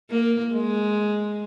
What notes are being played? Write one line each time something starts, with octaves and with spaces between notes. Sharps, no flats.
A#3
G#3